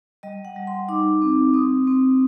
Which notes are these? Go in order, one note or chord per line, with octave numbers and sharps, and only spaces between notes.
G3 D#5
F#5
G3
C6
D#4 D6
C4
C4 D#6
C4